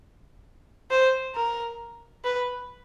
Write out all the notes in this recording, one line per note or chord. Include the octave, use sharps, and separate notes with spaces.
C5
A#4
B4